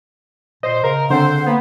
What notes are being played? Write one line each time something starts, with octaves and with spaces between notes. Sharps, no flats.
A#2 C5 D#5
C#3 A#4
D3 C4 A4 C5 F#5
A#3 B3